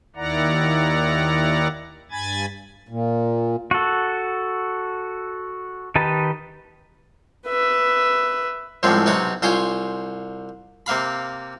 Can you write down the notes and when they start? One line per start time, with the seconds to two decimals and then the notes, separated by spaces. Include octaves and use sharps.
0.16 D#2 D#3 E4 D5 F#5 A#5
2.11 G2 G#5 B5 G#6 A6
2.89 A#2
3.71 F#4 A4
5.96 D#3 D#4 G4 B4 A5
7.47 B4 E5
8.83 C2 A2 C3 F3 G#3 C#4
9.06 B1 C3 D#4 C#5 F#5
9.42 C2 F4 C5 C#5 G#5
10.86 C3 A#3 F5 B5